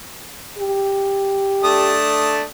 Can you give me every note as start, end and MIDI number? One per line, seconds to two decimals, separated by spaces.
0.58 1.97 67
1.64 2.41 57
1.64 2.41 62
1.64 2.41 87